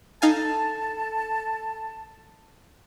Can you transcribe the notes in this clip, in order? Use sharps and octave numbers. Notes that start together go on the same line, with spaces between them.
D#4 A4 F5 G#5 A5